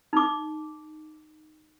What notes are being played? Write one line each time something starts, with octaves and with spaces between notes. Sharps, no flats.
D#4 D6